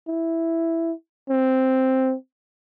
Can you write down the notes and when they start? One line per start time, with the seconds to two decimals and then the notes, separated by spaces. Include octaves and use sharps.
0.08 E4
1.30 C4